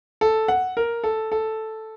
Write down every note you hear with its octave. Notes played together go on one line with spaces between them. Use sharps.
A4
F#5
A#4
A4
A4